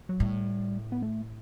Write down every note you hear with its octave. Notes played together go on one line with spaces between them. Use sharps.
F#3
A2 G3
B3
A3